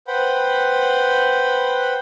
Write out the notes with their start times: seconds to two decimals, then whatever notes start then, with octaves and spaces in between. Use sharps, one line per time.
0.08 B4 C5 F#5 G5 B5